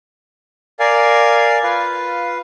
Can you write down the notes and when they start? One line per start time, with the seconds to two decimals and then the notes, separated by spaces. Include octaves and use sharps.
0.80 A#4 D5 F5 G#5
1.63 F4 B4 F5